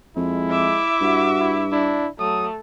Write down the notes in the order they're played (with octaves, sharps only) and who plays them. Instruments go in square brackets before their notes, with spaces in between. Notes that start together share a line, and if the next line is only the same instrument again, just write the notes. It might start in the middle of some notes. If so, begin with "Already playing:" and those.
[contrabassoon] F2 [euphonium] G#3 [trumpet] E4
[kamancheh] E5 D6
[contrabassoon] G2 [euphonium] F#4
[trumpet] E4
[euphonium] D4 [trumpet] E4
[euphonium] F#3 [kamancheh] A3 [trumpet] D#6